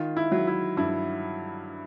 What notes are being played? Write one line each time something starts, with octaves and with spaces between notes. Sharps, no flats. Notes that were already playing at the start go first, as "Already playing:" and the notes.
Already playing: D#3 F4
E4
F#3
E4
G2 E4